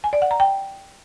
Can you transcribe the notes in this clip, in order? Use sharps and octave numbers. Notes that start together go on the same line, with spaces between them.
G#5
D5
F#5
A#5
G5